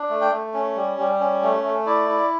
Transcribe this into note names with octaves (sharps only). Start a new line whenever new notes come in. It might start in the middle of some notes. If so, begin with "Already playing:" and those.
Already playing: D4
A3
G5
A3
C#4
G3
G3
C#4
A3
A3
E4 D5
E4